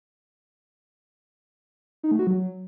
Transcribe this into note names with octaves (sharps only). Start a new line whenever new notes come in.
D#4
A3
F#4
F#3